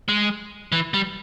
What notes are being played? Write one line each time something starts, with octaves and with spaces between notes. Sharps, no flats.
G#3
E3
G3